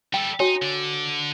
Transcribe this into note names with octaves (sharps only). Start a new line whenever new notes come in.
G3 A4 G5
D#4 F#4 C#5 G#5
D3 D5